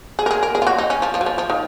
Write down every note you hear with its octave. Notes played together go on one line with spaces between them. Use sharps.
G#4
A#4
G#4
A#4
G#4
F4
F#4
D#4
C#4
F3
F3
F#3
F3
F3
D#3